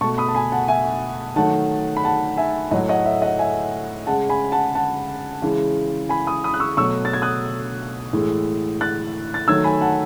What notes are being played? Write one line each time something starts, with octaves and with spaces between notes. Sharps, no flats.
B2 A3 A5 C#6
B5 D#6
A5
G#5 B5
F#5 A5
E5 G#5
D#3 F#3 A3 F#5 A5
B5
F#5 A5
E5 G#5
A2 F#3 A3 D#5 F#5
D#5 F#5
E5
D#5 F#5
E5 G#5
C#3 G#3 F#5 A5
G#5 B5
F#5 A5
F#5 A5
C#3 E3 G#3
G#5 B5
B5 D#6
B5 D#6
F#6
C#6 E6
B2 F#3 A3 C#6 E6
A6
G#6
D#6 F#6
A2 E3 G#3
F#6 A6
A6
D#3 F#3 A3 E6 G#6
G#5 B5
F#5 A5